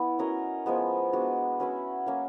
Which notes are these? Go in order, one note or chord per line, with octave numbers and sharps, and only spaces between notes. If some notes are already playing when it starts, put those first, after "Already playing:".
Already playing: B3 E4
C#4 F#4 A#4 D#5
F3 G#3 B3
G#3 B3 D4 F#4
C#4 F#4 B4 E5
F#3 A#3 C#4